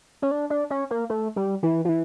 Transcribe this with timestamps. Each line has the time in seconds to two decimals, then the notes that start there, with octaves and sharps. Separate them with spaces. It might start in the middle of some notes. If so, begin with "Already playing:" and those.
0.22 C#4
0.31 D4
0.50 D4
0.70 C#4
0.91 A#3
1.10 A3
1.36 G3
1.63 E3
1.85 F3
1.89 E3